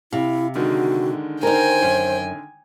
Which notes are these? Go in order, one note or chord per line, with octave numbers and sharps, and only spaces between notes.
C3 E4 F5
D3 D#3 G#3 F#4
D#4 A#4 C5 G5 G#5
F#2